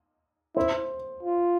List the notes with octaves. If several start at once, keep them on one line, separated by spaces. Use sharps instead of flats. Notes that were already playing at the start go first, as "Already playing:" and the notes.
E4 C5
F4